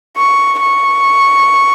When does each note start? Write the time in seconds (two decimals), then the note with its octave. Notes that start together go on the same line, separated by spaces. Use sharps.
0.17 C#6
0.61 C#6